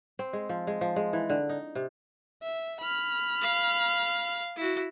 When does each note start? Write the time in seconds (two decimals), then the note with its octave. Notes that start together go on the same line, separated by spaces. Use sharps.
0.19 C4
0.33 G#3
0.49 F3
0.67 G#3
0.81 F3
0.96 G#3
1.13 E3
1.30 D3
1.49 D#4
1.75 C3
2.43 E5
2.81 B5 F6
3.42 F5
4.56 E4 F#4